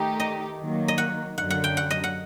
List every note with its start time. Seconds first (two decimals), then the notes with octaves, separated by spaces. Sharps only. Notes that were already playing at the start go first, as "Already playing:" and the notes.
Already playing: D#3 A3 D#4 G4
0.20 D#5
0.59 D#3 F#3 A#3
0.88 D#5
0.98 F#5
1.37 F#2 D3 F#3 F#5
1.50 F#5
1.64 G5
1.77 F#5
1.91 D#5
2.04 F#5